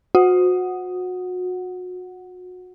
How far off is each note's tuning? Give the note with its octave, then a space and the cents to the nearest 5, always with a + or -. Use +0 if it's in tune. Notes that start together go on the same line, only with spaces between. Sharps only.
F#4 -30 F#5 +0